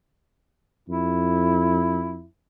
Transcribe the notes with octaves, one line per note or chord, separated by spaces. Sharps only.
F2 E4